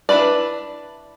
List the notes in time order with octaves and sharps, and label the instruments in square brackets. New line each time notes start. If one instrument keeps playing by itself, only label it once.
[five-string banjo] D4 E4 F4 B4 D5